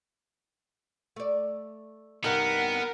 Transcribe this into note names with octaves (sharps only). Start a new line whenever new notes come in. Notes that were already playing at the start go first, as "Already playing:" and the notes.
A3 D5
G2 C3 B3 D#4 A#4 F#5